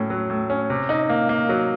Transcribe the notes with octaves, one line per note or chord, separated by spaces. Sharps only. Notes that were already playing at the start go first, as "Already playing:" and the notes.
Already playing: A2 F#3 C#4
F#3
A2
C#4
C3
D#4
A#3
A#3
F#3